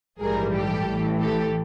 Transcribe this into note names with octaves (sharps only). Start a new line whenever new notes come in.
A#1 G#2 E3 G3 G#4 A#4
G4 A4
A1 A2 E3
G4 A4